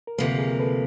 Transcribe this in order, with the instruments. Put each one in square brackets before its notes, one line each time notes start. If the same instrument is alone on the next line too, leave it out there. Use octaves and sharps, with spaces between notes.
[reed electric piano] A#4
[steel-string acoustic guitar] D2 C3 F3 A#3 [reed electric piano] A4 B4
[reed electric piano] G#4 A#4
A4 B4